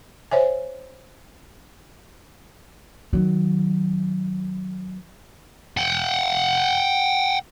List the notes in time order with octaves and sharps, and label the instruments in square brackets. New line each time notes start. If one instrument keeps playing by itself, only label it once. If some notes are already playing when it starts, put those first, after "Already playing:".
[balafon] C5 C#5 E5 G#5
[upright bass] D#3 F#3
[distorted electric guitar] F#5 G5